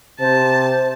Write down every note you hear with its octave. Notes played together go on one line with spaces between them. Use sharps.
C3 C5 A5